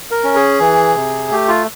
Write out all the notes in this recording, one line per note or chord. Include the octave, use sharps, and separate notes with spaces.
A#4
C#4
G#4
E3
C3
A3 G4
F4